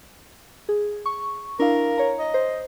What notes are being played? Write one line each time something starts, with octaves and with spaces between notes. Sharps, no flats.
G#4
C#6
D4 E4 A#4 F5
C#5 A#5
D#5
C5